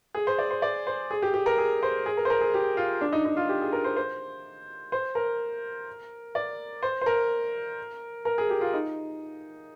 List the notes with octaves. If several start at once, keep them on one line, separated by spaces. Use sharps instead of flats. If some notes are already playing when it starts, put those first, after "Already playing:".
G#4
C5
D5
C5
D5
C5
G#4
G4
G4
A#4
G#4
C5
G#4
A#4
C5
A#4
G#4
G4
F4
D4
D#4
D#4
F4
G4
G#4
A#4
C5
C5
C5
A#4
D5
C5
C5
A#4
A#4
G#4
G4
F4
D#4